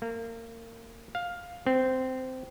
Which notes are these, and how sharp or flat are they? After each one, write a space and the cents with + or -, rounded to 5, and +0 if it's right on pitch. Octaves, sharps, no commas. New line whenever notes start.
A#3 -30
F5 +10
C4 -15